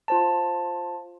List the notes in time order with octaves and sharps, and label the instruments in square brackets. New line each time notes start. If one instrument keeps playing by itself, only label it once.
[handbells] F4 C5 A5